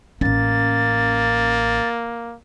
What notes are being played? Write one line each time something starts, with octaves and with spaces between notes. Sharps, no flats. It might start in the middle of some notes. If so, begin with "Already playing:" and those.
A1 A#3 C#4 A6